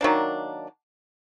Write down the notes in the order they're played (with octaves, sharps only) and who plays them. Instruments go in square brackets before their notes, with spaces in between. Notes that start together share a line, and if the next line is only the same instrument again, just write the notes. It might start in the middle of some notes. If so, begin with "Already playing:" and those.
[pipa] D#3 F#3 A#3 D4